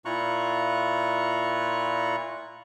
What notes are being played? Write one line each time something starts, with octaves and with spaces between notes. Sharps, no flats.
A#2 E4 F4 A#5 C#6 F#6